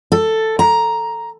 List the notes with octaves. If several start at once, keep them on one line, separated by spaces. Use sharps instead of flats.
A4
A#5